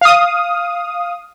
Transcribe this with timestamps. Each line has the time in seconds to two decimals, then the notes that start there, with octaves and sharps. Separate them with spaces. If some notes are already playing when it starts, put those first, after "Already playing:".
0.01 F5 D#6